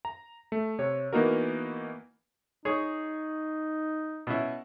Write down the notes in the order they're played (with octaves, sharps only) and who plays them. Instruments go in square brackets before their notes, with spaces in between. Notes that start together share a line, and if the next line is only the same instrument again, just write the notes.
[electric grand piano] A#5
A3
C3 C#5
E3 A#3 B3 D#4 F#4 A#4
[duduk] D#4 [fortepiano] G#4 C#5
[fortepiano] B2 C#4 E4